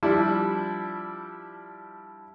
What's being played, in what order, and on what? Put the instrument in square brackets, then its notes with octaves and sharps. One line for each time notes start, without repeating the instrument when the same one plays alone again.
[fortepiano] F3 G3 D4 E4